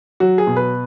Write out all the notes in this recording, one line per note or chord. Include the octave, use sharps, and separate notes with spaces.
F#3 F#4
G#4
B2
B4